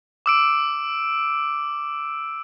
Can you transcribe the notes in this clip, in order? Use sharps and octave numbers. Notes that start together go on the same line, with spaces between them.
D6 E6 D7